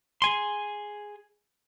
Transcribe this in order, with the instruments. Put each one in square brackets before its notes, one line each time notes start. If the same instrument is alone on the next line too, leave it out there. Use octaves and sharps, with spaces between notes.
[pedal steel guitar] G#4 G#5 C6